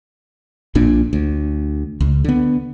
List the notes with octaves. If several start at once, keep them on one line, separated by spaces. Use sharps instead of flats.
A#1 A#2 D4
D2
C#2
D3 B3